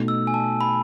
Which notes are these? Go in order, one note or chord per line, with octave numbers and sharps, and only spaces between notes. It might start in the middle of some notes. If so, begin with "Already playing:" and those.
Already playing: B2 A3 D#4 A4
E6
G#5
A5
B5